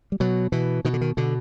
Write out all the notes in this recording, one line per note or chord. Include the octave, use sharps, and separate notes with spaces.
G3
B2 F#3
B2 E3
B2 D#3
D3
D#3
B2 D3